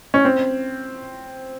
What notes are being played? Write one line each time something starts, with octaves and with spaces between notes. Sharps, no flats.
C#4
C4